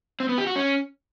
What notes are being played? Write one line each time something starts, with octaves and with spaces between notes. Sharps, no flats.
C4
B3
G4
F#4
C#4